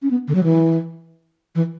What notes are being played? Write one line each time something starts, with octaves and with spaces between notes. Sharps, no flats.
C#4
B3
D3
F#3
E3
E3